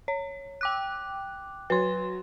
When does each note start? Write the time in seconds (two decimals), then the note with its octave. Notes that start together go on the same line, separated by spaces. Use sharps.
0.08 C#5
0.61 G5 D6 F#6
1.70 F#3 B4 C6